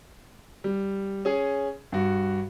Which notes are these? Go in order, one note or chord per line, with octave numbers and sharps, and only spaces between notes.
G3
C#4 G#4
G2 F#4